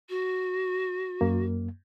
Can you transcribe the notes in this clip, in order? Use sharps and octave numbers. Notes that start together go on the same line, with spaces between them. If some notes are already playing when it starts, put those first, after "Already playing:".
F#4
F#2 A#3